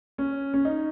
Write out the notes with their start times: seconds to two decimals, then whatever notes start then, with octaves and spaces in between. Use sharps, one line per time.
0.18 C#4
0.54 C#4
0.65 D#4